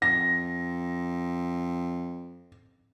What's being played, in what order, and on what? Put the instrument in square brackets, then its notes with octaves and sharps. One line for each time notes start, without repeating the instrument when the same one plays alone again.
[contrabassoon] F2 [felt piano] A#6